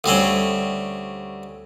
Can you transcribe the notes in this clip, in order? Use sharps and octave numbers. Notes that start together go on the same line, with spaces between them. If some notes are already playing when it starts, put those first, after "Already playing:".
D2 G3 C4 C#4